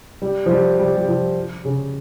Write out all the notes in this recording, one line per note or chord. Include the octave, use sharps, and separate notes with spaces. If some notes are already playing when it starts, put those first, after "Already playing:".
G3
F3
G3
G3
G3
F3
C#3